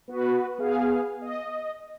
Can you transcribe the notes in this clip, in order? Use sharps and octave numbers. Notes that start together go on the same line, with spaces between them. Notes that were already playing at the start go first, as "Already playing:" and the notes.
B3 F#4 B4
B3 G#4 F5
D#5